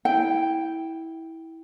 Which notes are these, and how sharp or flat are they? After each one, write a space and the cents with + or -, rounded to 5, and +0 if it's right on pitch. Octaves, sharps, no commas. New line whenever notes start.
E4 -15 G5 +0